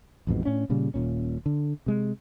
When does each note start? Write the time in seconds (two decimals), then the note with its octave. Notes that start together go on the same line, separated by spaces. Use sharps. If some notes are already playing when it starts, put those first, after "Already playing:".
0.27 A1 F2 G#2 B2
0.44 A2 C#4 D4
0.70 A#2 C#3 G3
0.94 D#1 A#2 C#4
1.46 D3
1.86 C3 G#3